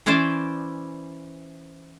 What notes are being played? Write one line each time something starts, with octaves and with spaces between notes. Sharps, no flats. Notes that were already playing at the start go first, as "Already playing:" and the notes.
E3 C#4 E4 C5 D5